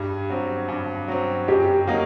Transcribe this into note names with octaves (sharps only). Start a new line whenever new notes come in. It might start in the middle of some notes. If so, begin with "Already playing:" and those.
Already playing: G2 G4
F#3 C4
G2
F#3 C4
F#2 G4
F#3 A#3 D#4